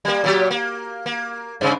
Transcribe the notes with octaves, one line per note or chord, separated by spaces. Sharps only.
G3 A#3
A#2 F#3 G4
A#3
A#3
G2 C#3